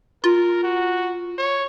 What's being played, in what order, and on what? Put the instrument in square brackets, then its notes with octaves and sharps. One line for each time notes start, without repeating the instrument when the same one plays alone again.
[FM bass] F4 [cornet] A#4
[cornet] F#4
C#5